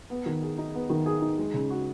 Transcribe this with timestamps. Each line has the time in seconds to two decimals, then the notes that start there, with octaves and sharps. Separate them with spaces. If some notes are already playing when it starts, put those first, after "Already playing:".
0.10 B3
0.26 D#3
0.42 G#4
0.58 D#4
0.74 B3
0.90 D#3
1.06 G#4
1.22 D#4
1.38 G#3
1.54 C#3
1.70 F#4